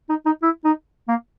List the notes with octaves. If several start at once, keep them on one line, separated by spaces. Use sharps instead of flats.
D#4
D#4
E4
D#4
A#3